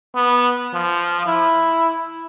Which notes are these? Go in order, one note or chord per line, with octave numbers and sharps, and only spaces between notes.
B3
F3
E4